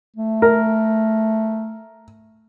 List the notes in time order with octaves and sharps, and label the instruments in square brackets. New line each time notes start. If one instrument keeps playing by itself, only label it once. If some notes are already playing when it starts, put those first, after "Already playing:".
[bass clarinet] A3
[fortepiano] A#4